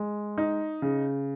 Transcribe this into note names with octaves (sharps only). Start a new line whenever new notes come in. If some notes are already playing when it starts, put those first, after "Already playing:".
Already playing: G#3
D#4
C#3